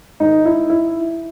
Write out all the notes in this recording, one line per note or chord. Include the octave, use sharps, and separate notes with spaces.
G#2 D#3 D#4
E4
E4